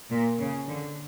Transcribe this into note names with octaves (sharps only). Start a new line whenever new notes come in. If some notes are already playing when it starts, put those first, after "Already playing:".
A#2
C#3
D3